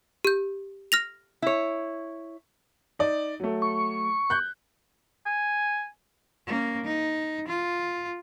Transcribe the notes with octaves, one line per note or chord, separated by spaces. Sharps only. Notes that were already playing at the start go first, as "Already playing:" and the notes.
G4 G6
F6 A#6 F7
E4 C#5
D#4 D5
F#3 A3
C#6
F#6 G6
G#5
A#3 C#4
D#4
F4